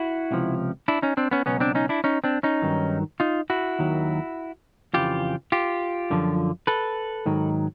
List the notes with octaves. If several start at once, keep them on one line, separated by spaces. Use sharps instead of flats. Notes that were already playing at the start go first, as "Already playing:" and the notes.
Already playing: E4 F#4
C#2 C3 F3
D4 E4
C#4 D#4
C4 D4
B3 C#4
C#2 B2 F#3 B3 C#4
C4 D4
C#4 D#4
D4 E4
C#4 D#4
C4 D4
C#4 D#4
G2 D#3 F#3
D#4 F4
E4 F#4
D#2 D#3 F#3
F2 C#3 E3 F4 G4
F4 G4
F#2 D3 F3
A4 B4
G#2 D#3 F#3